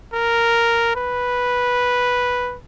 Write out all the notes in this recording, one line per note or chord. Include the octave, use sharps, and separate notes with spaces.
A#4
B4